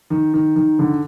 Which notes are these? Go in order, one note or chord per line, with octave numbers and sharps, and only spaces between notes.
D#3
D#3
D#3
D3